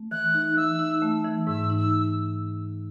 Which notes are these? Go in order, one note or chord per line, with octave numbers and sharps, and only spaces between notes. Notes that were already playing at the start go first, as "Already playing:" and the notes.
Already playing: A3
E3 F#6
D#4
E3 E6
D#4
A3
E3
G#2 E6
D#4
E6